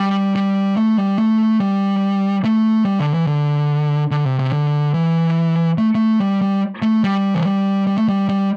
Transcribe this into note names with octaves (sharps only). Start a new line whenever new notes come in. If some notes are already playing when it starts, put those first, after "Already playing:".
Already playing: G3
G3
A3
G3
A3
G3
A3
G3
D3
E3
D3
D3
C3
C3
D3
E3
A3
A3
G3
G3
A3
G3
E3
G3
G3
A3
G3
G3